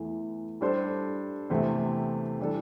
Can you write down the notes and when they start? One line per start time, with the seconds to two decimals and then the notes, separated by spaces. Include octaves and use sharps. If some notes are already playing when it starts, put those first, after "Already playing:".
Already playing: E2 E3 A3 E4
0.61 G3 D4 A4 C5
1.50 E2 C3 A3 C4
2.39 E3 G3 D4 A4